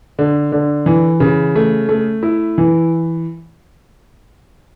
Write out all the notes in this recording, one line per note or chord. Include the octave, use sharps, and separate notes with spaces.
D3
D3
E3
C#3
A3
A3
E4
E3